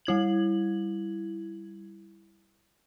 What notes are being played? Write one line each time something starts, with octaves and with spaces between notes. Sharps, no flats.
G3 E4 G#6 F#7